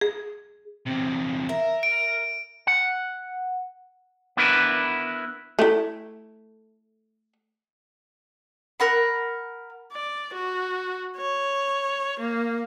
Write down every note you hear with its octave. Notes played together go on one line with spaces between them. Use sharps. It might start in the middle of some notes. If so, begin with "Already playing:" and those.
G#4
E2 C3
A#4 E5
D7
F#5
B3 D4 E4 A#4 B4
A3 E4
A#4 F#5 B5
D5
F#4
C#5
A#3